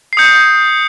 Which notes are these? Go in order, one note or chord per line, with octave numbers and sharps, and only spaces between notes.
C7
D#6 G6 C#7